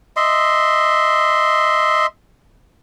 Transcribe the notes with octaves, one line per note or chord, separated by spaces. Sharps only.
D#5 E5 C6